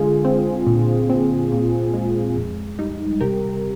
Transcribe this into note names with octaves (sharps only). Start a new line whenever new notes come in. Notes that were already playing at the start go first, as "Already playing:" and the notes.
Already playing: D3 G#3 F4 G#4
C4
A#2
C4
A#2
G#3
F2
G3 D#4
C3 G4 A#4